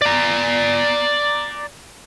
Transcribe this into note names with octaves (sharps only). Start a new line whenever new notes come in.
D5 A#5